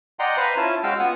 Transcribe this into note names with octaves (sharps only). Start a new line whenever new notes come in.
D5 D#5 F#5 G5 A#5 C6
B4 C5 F5 G#5 A#5 B5
C#4 E4 F4 G#5 A5
G#3 C#4 F#4 F5 G5 E6
B3 F4 F#5 G#5